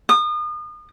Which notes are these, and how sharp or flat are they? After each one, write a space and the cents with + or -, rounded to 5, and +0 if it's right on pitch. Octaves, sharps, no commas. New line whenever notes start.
D#6 -35